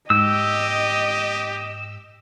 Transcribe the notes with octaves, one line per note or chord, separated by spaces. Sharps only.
G#2 G4 D#5 E6